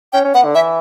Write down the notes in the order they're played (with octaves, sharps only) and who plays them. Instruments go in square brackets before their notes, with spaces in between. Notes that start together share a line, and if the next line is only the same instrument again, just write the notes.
[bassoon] C#4 [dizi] G5
[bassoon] C#4
[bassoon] B3 [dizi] F#5
[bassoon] D3
[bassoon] E3 [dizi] E5